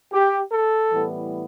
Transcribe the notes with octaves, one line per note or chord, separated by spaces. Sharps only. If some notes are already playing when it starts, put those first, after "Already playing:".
G4
A4
A2 E3 G3 B3